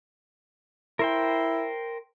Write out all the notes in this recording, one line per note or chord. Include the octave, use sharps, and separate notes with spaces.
E4 A#4 C5 G5